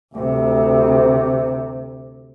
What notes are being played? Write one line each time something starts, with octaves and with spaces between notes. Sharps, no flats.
D2 C3